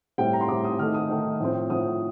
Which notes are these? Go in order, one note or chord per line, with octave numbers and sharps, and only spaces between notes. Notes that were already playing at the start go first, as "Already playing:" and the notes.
A2 G3 C4 G5
A#5
C6
A2 G3 C4 D6
D#6
D#3 A3 D#4 F6
D#6
D#3 A3 D#4
A2 F3 C4
A2 F3 C4 D#6